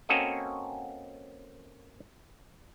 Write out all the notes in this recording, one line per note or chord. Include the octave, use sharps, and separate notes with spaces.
A#3 C4 C#4 F#4 A4 D#5